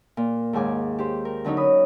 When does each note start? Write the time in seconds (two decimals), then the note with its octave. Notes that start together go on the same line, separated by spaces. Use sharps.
0.17 A#2
0.53 D#2 G#2 G#5 D6
0.99 G4 C5
1.25 A#4
1.45 D3 F#3 C#4 D#4 C#5
1.57 C#4 B5 D#6